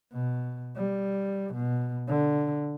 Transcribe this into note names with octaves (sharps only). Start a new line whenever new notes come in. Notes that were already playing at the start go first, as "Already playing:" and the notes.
B2
G3
B2
D3